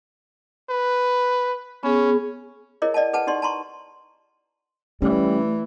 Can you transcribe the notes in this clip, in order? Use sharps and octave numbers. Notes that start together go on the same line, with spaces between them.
B4
B3 C#4 G#4
E4 G#4 A#4 C#5 D#5
D5 D#5 F#5 A5
G#4 B4 F#5 A5
D#4 G4 D5 C6
A5 A#5 C6 C#6
E3 G3 A3 C#4